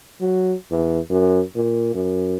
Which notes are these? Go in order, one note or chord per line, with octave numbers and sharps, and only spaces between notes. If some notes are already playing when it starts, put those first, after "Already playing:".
F#3
E2
F#2
A#2
F#2